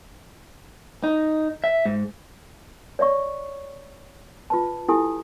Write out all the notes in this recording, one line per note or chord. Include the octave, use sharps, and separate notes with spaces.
D#4
E5
G#2
C#5 D5 E5 C#6
F4 B4 A5
E4 G4 A4 G#5 D#6